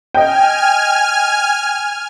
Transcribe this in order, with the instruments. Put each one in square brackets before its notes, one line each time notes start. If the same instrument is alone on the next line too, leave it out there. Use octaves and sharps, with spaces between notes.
[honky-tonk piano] D#5 G5 [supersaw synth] G#5 F6